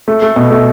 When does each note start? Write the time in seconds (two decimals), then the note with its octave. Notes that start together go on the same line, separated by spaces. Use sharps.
0.08 A3
0.22 A3
0.36 B2
0.51 A3